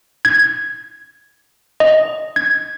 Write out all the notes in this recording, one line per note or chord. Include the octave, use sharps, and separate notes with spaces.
G#6
D#5
G#6